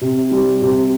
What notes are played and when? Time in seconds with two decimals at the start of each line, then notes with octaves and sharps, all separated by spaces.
0.01 C3
0.31 G3
0.62 C3